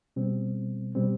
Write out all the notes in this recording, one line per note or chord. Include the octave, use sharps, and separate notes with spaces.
B2 G3 C4
B2 G3 C4